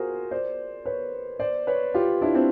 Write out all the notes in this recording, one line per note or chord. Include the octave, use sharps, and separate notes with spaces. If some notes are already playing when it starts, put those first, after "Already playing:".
Already playing: F4 F#4 G#4 A#4 C5
C5 D5
B4 C#5
C5 D5
B4 C#5
F4 G4
D4 E4
C4 D4